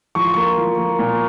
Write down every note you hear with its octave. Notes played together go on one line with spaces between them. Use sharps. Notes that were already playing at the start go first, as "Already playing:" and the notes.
F3 C#6
C6
A#3 C#6
F3
A#3
A#2